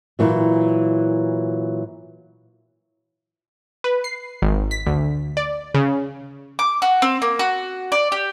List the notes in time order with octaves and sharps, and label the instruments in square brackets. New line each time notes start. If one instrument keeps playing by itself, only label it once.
[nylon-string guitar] A#2 E3 F#3
[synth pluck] B4
C7
G#1
B6
D2
D5
C#3
[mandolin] D6
F#4
C4
A#3
F#4
D5
G4